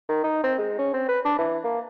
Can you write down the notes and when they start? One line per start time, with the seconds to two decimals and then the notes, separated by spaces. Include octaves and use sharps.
0.09 D#3
0.24 D#4
0.43 C4
0.59 G#3
0.79 C#4
0.94 C4
1.09 B4
1.25 D4
1.39 E3
1.64 A#3